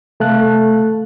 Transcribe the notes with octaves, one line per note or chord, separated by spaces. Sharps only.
C3 A3 A4 F5 A5 F#6